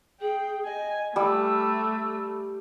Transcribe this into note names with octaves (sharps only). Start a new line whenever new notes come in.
G#4 G5
D#5 G#5
G3 A3 D6 E6